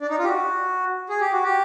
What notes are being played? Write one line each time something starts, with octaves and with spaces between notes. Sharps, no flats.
D4
D#4
F4
G4
F#4
G#4
G4
F#4
G4